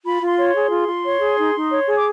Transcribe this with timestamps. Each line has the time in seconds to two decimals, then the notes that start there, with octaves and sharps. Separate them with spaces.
0.04 F4 B5
0.21 F4
0.27 C6
0.38 C#5
0.49 C6
0.55 G#4
0.71 F4
0.88 F4
1.04 C#5
1.21 G#4
1.38 D#4
1.55 D#4
1.71 C#5
1.88 G#4
1.96 D6